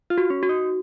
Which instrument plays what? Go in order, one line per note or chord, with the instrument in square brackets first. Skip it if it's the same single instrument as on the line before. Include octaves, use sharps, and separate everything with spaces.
[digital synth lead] F4
[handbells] F#4
[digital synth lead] C#4
[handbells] F#4
[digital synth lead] D#4